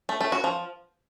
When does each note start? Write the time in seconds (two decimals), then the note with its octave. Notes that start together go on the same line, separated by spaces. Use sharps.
0.09 A3
0.21 A3
0.32 F#4
0.44 F3